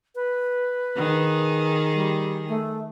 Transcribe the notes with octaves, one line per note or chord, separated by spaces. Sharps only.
B4
D#3 G#4
G3
A3